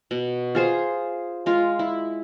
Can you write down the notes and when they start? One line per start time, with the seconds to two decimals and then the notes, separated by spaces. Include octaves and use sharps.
0.11 B2
0.55 F4 G#4 C5
1.46 G#3 F4
1.79 E4